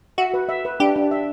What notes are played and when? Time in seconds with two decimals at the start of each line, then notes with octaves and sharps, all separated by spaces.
0.18 F#4 E5
0.34 B4
0.49 E5
0.65 B4
0.80 D4 G4
0.96 D4
1.11 E5